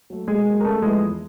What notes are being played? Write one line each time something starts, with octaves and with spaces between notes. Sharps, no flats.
F#3 A3
B2 G#3 G#4
F#3 A#3
A#4
C#3 A3 A4
F3 G#3 B3 E4 G#4
E2